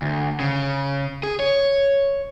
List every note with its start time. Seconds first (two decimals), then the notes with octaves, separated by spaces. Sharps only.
0.02 D2
0.40 C#3
1.23 G#4
1.40 C#5